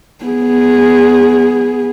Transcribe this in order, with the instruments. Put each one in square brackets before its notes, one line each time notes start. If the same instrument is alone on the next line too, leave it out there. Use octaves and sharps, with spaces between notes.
[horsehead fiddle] B3 G#4